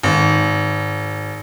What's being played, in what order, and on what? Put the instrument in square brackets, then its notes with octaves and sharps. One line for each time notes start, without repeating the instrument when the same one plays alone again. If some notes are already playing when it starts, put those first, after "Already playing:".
[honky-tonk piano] G#1